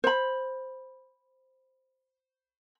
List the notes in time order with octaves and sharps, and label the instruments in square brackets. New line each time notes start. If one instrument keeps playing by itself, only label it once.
[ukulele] C5 B5